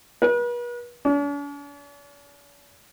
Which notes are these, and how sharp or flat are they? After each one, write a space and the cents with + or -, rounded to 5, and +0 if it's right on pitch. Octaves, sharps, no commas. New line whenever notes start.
B4 -40
D4 -45